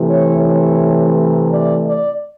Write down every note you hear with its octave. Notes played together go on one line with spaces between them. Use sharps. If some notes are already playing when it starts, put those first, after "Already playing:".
Already playing: C3 E3 A3
C#5
C#5
D5
D5